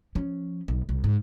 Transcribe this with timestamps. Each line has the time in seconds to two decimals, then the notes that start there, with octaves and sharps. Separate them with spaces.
0.15 F3 C#4
0.68 B1
0.89 C2
1.04 G#2